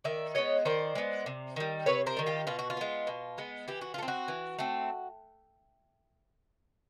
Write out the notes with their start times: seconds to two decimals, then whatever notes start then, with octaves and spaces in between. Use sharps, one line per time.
0.04 D#3 D5 E5
0.35 G#3 B3 C#5 D#5
0.65 D#3 C5 D5
0.95 G#3 B3
1.26 C3
1.56 D#3 G3
1.86 C3 B4 C#5
2.06 A#4 C5
2.17 D#3 G3
2.26 F4 G4
2.47 B2 F4
2.59 F#4
2.70 F4
2.77 G#3 B3
3.07 B2
3.38 G#3 B3
3.68 E3 G4
3.81 F#4
3.94 A3 F4
4.02 C4
4.08 F#4
4.28 E3
4.59 A3 C4